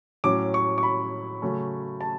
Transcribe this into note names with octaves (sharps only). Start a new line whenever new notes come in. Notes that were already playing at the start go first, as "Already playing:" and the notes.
A2 F#3 C#4 D6
C#6
C#6
B5
C#3 F#3 A3 C#4
A5